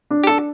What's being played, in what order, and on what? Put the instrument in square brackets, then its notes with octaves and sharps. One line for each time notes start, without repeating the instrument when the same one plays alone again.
[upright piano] D4
[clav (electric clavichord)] G4
[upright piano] D4 [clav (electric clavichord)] A4